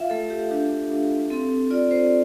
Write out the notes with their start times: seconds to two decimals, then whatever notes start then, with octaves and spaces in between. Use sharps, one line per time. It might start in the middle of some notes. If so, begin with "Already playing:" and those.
Already playing: F4 E5 F5
0.10 A3 A4
0.30 G4
0.51 D4 G4
0.91 D4
1.30 C4 A4
1.70 F4 D5
1.91 C5